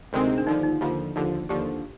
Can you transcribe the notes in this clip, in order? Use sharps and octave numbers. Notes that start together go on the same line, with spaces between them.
D2 C3 D#3 G#3 C4
D4
D#2 D3 F3 D#4
D#4
D#2 D3 F3 F4
D#2 D3 F3
D#2 D3 F3 G4